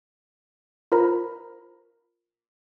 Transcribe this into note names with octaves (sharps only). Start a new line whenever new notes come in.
F4 A#4 C5 A#5 B5